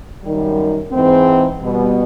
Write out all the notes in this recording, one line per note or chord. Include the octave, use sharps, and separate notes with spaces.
F#2 D#3 G3
G#2 E3 G#3 C4
B2 G3 B3